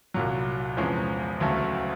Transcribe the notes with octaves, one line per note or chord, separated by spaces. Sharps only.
C2 A#2 F#3
E2 C3 F3 G#3 C#4
D2 C#3 F#3 A3